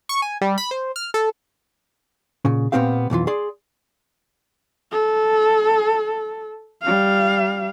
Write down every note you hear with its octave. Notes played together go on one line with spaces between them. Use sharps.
C#6
G#5
G3
B5
C5
F6
A4
A#2 C#3
A#2 E3 B3 C4 G4 F5
B1 F2 E3 F4
G#4 D5 C6
A4
G3 F5